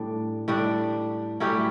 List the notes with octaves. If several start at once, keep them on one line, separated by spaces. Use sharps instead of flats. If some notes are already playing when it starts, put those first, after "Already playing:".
Already playing: A2 G3 D4
A2 G3 D4
A2 F#3 G3 C#4 E4 G4